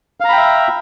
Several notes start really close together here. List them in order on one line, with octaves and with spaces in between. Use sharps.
F5 A#5 B5 G5 E5